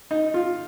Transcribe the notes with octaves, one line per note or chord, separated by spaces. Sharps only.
D#4
F4